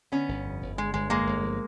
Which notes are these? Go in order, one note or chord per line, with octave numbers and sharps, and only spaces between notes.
D3 B3 C#4
G1
F2
G1
D3 G#3
G1 G#3
F2 G#3 A#3
G1
F3